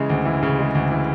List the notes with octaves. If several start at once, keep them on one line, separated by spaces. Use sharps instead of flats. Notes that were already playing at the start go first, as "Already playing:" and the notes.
Already playing: C#3 E3 G#3
D2
E3
C#3
G#3
D2
E3